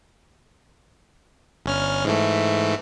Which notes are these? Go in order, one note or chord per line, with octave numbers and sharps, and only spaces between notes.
G1 C#4 F6
G#2 E3 A3